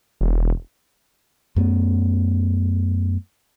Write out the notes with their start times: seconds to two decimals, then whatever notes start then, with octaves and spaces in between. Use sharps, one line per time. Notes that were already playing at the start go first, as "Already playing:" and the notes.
0.21 E1
1.56 F#2 A3 B3